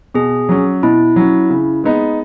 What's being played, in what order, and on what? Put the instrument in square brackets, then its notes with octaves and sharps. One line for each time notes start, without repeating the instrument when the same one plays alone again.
[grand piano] B2 [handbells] G#4
[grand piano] F#3 C#4
[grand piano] B2 [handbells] E4
[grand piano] F#3 C#4
C#3
G#3 B3 D#4